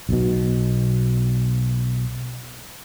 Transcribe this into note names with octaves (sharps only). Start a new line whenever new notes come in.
B1 B2